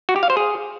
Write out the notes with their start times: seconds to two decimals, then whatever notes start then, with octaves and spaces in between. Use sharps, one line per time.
0.09 F#4
0.16 G4
0.23 F5
0.30 C5
0.37 G#4